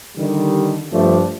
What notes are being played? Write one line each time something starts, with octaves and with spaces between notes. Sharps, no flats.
D3 D#3 G3
G2 F3 A3 D4